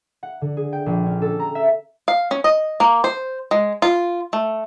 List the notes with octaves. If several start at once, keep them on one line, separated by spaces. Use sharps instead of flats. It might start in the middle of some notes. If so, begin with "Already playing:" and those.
F#5
D3
G#4
G5
A#1
C#4
A4
A#5
E5
F5
C#4
D#5
A#3
C5
G#3
F4
A3